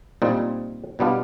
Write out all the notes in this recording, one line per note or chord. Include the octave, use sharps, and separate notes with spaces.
A#2 G3 C4 D#4
B2 G3 B3 D4 F4